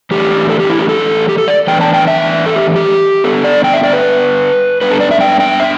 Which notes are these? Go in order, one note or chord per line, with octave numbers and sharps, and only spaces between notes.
A2 E3 A3 D4 G4
A4
G4
E4
G4
A4
G4
A4
D5
A2 E3 B3 D4 G5
A5
G5
E5
A4
G4
G4
G2 D3 B3 A4
D5
G5
E5
D5
B4
G2 G3 B3 D4 B4
A4
D5
E5
G5
G5
E5